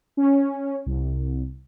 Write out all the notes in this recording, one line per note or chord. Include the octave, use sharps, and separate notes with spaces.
C#4
C2